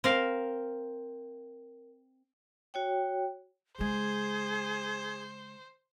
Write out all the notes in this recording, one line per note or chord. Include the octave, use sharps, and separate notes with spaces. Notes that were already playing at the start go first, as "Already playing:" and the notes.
C4 A#4 F5
F#4 C#5 G5
C#3 G#3 G#4 C5